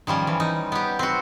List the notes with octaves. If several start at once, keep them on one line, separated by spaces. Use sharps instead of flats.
D#3 F3 G3 C#4
E3
D#4
B3 G4
C4 F#4